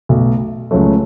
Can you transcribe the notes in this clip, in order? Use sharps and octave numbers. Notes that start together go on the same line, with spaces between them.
B1 B2 A3
C#2 C#3 F#3 A3